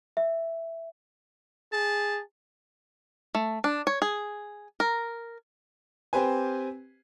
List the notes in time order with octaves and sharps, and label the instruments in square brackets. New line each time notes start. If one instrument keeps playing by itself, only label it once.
[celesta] E5
[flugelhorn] G#4 [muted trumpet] A5
[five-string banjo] A3
D4
C#5
G#4
A#4
[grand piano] C4 G4 B4 C5 G#5